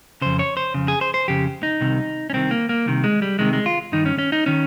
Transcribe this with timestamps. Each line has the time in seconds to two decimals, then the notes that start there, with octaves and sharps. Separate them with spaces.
0.21 F2 C#3 C5
0.39 C#5
0.57 C5
0.74 F2 C#3
0.88 G#4
1.01 C5
1.14 C5
1.28 F2 C#3 G4
1.63 D#4
1.81 C2 C3 D#3
2.30 C#4
2.33 C2 C3 D#3 C4
2.51 A#3
2.69 A#3
2.86 C2 C3 D#3
3.04 G#3
3.22 G3
3.39 C2 C3 D#3 G#3
3.53 G#3
3.66 F4
3.92 G2 D#3 D#4
4.06 C#4
4.18 C#4
4.32 D#4
4.46 D#3 C#4